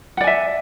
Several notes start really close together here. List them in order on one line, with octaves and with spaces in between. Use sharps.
F#5 D5 G#5 E5